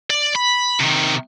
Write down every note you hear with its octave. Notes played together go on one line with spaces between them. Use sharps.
D5
B5
C3 D#3